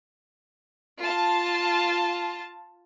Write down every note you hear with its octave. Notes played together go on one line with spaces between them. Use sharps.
F4 A5